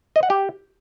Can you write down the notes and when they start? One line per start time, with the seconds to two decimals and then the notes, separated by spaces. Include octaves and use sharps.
0.16 D#5
0.23 F#5
0.30 G4